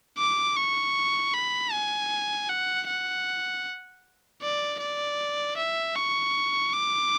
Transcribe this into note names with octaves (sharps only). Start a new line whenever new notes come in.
D6
C#6
B5
G#5
F#5
F#5
D5
D5
E5
C#6
D6